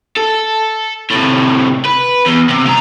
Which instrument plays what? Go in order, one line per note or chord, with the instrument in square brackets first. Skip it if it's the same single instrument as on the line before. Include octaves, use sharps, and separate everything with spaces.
[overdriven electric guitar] A4
A2 C3
B4
E2
C3
G#3 A#5